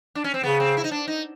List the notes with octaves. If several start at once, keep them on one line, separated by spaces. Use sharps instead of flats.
D4
C#4
C4
C#3 B3
C4
E4
D#4
D4
D#4